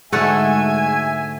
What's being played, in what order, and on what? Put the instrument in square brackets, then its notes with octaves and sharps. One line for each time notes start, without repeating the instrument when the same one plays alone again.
[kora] G#2 D3 [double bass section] G#3 [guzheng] A3 F#4 A4 [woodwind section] E5 G#5